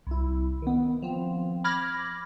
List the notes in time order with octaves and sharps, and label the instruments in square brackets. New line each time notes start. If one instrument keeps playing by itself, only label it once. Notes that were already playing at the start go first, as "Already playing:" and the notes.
[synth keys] C2 E4
D#3 B3
F3 C4
B5 D6 F6 G#6 A#6